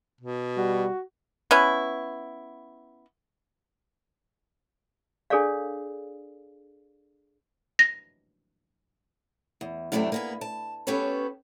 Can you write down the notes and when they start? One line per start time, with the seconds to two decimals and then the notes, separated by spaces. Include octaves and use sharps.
0.21 B2
0.57 G3 F#4
1.51 B3 C#4 E4
5.30 D4 G#4 A4 C#5 D5 F5
7.79 A#6
9.61 E2
9.92 F#2 A2 C3 A3 C#4 D4
10.12 A#3 B3 G#4
10.41 A5
10.87 B3 C#4 G4 A4 B4 C#5